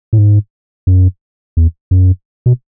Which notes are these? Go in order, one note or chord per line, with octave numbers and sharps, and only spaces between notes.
A2
G#2
F#2
E2
F#2
B2